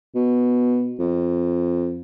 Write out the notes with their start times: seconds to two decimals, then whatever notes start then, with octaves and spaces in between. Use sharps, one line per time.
0.15 B2
0.99 F2